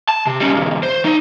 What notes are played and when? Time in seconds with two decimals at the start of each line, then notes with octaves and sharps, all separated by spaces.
0.09 A5
0.27 C3
0.40 G3 C#4
0.54 B1 E2
0.83 C5
1.05 D#4 E5